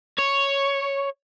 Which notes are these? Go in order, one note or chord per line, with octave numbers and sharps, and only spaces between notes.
C#5